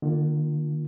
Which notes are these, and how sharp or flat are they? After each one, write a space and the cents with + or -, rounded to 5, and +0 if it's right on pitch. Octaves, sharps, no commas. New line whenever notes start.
D3 +45 A#3 +0 F4 +0